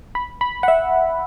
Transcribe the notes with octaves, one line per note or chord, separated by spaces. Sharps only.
B5
B5
F#5
E5